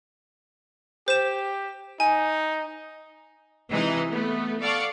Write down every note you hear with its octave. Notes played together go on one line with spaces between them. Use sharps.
G4 C5 E7
D#4 G#5
C3 E3 G#3 D#4
A3 B3
A4 D5 F5 F#5 C#6 D6